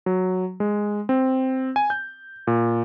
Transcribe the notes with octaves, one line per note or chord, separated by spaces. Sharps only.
F#3
G#3
C4
G#5
G6
A#2